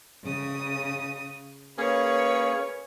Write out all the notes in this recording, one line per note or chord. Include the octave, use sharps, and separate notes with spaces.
C#3 D#6
A#3 C#4 G#4 B4 C#5